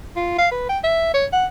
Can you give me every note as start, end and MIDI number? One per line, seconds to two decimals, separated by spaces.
0.16 0.36 65
0.38 0.49 77
0.51 0.66 71
0.69 0.79 79
0.84 1.13 76
1.14 1.26 73
1.33 1.46 78